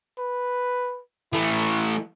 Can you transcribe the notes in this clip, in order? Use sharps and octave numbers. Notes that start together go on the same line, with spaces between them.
B4
E3 A3 E4